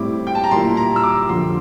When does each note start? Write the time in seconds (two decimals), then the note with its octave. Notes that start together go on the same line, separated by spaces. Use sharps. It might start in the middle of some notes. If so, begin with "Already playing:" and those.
Already playing: A2 G3 C4 E4 D6
0.27 G5
0.35 A5
0.44 A#5
0.51 A#2 G3 A#3 E4 C6
0.77 A#5
0.96 E6
1.03 D6
1.29 F2 D3 F3 C6